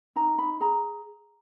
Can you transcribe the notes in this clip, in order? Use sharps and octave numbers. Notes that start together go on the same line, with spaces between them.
D#4 A#5
D#4 B5
G#4 A#5